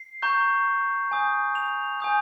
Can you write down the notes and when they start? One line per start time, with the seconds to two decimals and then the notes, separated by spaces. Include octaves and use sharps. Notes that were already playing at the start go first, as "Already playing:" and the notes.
Already playing: C7
0.22 A#5 C#6 G6
1.11 G#5 D#6 G6
1.55 F7
2.00 G#5 D#6 G6